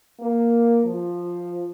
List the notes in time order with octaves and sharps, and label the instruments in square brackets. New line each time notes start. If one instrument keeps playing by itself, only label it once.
[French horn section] A#3
F3